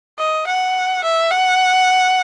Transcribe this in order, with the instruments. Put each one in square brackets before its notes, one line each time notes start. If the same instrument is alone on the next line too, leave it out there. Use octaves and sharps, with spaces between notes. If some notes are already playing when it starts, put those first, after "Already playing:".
[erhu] D#5
F#5
E5
F#5